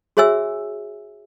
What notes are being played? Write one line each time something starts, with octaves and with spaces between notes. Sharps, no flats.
F#4 G#4 C#5 E5 G#5 E6